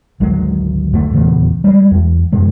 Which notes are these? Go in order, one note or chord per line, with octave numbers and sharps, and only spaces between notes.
G#1 D2 F#3 G#3
D2 G#2 A3
D#1 E2 C#3
G3 G#3
E2
F#2 C3 G#3